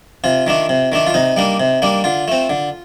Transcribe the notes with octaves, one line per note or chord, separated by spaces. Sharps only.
C3 F4
D#3 A3 D4
C3
D#3 A3 D4
F4
C3 D#4
G3 A#3 D4
C3
G3 A#3 D4
D3 F4
A3 C4
D3